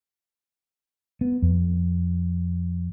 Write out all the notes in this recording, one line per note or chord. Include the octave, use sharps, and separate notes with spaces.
B3
F2